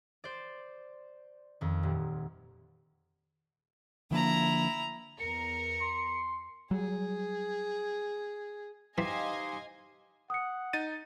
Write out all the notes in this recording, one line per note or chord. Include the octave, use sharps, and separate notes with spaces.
C5 D5
F2 D#3
D#1
D3 F3 A#3 D4 E4 A#5
E2 A#4 A#5 C#7
C6
F#3 G3 G#4
E3 D#4 G4 C5 D#5 F5 G#5
F#5 D#6 C#7
D#4 A6 D#7